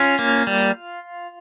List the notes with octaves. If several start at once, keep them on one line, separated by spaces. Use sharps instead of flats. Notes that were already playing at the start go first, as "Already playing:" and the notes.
Already playing: C#4 F4
A#3
G3